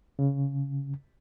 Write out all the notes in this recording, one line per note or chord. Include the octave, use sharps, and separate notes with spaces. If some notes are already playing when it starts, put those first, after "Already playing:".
C#3